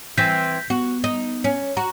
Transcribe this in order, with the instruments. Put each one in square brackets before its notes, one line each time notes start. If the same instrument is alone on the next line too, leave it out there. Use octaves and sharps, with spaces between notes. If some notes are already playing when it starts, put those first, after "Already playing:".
[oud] E3 C4 [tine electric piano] G6 A#6 B6
[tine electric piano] B3 [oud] F#4
[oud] D#4
C#4
[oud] F#4 [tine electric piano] A#5